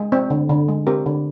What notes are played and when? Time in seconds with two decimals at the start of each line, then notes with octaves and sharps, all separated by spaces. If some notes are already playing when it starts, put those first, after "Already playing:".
Already playing: G#3
0.12 C4
0.30 D3
0.49 D3
0.68 G#3
0.87 C4 G4 A#4
1.06 D3